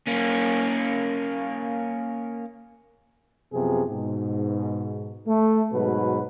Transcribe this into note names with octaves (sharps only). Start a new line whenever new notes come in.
A#3 C#4
F#2 C3 F3 B3 G#4
G#2 B2
A3
G#2 B2 F#3 B4